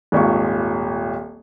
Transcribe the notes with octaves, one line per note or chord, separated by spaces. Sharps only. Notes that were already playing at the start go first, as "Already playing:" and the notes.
D#1 G#1 F4 C#6